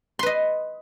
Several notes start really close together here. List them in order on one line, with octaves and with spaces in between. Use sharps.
C6 B4 D#5